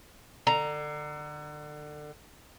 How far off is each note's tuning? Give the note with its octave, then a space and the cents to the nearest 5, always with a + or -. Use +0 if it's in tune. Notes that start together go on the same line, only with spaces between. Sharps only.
D3 +30 A#5 +0